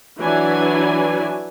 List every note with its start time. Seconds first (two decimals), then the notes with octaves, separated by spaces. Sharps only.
0.19 E3 F#3 D4 E4 G#5